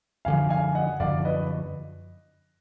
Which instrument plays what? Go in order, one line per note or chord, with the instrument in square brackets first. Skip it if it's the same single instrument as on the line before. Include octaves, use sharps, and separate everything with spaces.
[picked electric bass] F#2 D3 F3 [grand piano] F5 G#5
[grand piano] F5 G#5
D#5 F#5
[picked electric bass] F#2 D3 F3 [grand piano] D5 F5
[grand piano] B4 D#5